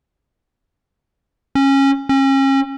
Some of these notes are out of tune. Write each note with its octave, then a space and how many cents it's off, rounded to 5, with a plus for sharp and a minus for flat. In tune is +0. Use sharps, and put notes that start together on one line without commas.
C#4 -20
C#4 -35